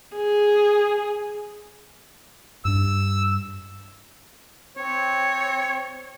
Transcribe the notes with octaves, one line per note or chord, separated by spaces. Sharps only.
G#4
G2 D4 E6
C4 C#5